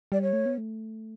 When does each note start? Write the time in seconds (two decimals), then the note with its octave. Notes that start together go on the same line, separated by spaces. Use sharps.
0.12 G3 D5
0.22 C#5
0.33 A3
0.46 B3
0.58 A3